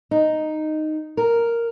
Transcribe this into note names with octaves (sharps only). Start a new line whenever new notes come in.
D#4
A#4